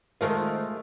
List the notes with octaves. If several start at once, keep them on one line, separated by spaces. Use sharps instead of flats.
D#3 G#3 A3 F4 A#4 C5